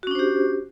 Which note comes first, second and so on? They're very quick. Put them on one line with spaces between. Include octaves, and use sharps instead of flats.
F#4 C#4 D4 C5 G4